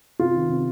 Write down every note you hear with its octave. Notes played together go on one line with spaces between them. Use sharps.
C3 F4
D#3
C3